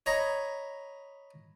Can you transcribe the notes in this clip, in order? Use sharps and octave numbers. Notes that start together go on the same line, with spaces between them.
C#5 D#5 A#5 B5